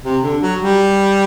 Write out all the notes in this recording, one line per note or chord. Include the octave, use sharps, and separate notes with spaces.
C3
D3
F#3
G3